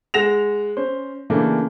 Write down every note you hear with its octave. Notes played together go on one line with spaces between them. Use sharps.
G#3 F#5 A#6 E7 F7
C#4 C5
C#3 E3 A3 A#3 D4